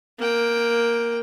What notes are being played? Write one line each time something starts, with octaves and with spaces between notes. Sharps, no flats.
A#3 G5